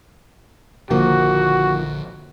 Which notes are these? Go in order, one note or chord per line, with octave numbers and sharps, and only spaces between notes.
A#1 D3 D#3 F3 A#3 D4 F#4